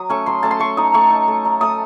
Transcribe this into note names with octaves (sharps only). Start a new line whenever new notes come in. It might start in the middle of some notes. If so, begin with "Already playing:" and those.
Already playing: F#3 D#6
A3 C#4 C#6
F#3 C6
A3 C#4 A5
C6
A3 C#6
D#4 D#6
A3 C#6
D#4
A3
D#4
A3 D#6